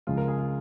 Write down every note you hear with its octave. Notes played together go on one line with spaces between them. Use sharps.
C#2 C#3 F3 G#3 F4
A#4
G#4
F4